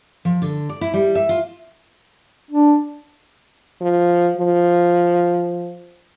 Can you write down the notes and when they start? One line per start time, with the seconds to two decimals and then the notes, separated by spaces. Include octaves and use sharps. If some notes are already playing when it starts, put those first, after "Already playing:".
0.25 F3
0.42 D3
0.69 D5
0.81 E4
0.94 G3
1.15 E5
1.29 F4
2.51 D4
3.81 F3
4.38 F3